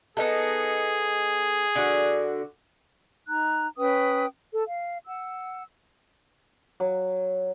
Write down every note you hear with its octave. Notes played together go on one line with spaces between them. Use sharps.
B3 D#4 G#4 A4
D3 F#4
D#4 A#5 F#6
C#4 B4 G5 D#6
A4
F5
F#5 E6
F#3